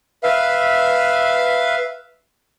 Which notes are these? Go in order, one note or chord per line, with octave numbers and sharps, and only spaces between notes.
B4 E5 F5